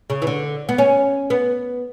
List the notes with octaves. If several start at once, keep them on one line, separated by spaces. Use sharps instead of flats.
C#3
E3
D3
B3
C#4
B3